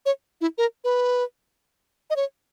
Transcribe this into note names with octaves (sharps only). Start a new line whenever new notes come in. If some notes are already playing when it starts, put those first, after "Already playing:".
C#5
E4
A#4
B4
D#5
C#5